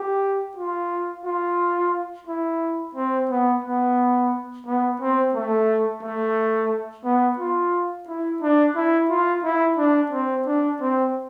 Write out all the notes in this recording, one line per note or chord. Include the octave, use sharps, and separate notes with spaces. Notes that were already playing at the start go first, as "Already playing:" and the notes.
Already playing: G4
F4
F4
E4
C4
B3
B3
B3
C4
A3
A3
B3
F4
E4
D4
E4
F4
E4
D4
C4
D4
C4